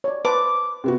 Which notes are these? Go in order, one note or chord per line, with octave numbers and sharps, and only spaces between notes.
C#5 D5
B4 C5 A5 D6
C3 B3 F#4